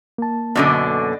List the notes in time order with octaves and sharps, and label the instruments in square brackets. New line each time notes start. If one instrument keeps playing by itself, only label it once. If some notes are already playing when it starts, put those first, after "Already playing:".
[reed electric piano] A#3 A5
[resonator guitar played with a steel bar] F#2 B2 D3 [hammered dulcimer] D4 D5 D#5